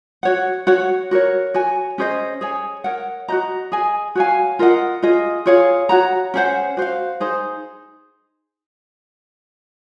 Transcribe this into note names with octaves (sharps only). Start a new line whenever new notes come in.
F#4 C#5 F#5
F#4 C#5 F#5
F#4 A#4 C#5
F#4 C#5 G#5
C#4 G#4 C5 D#5
G#4 C#5 G#5
A#4 C#5 F#5
F#4 C5 D#5 A#5
G#4 D#5 G#5
F#4 C#5 F5 G#5
F4 A#4 D#5 F#5
F4 G#4 D#5
F4 G#4 C#5 F5
F#4 C#5 F#5 A#5
C#4 G#4 C5 F#5
F#4 C5 F5
D#4 G#4 C5